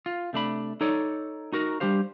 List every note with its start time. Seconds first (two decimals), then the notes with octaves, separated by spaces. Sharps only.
0.06 F4
0.33 C3 A3 D4 B5
0.81 D#4 A4 C#5 D5
1.52 D#4 F#4 A#4
1.80 G3 D4 G4 C5 F5